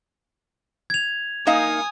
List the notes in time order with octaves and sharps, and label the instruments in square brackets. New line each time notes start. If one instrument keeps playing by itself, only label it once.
[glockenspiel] G#6 F7
[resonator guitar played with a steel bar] A#3 D#4 F5 [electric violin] G#5 D#6